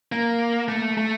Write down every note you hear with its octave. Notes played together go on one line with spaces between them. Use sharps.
A#3
A3
A3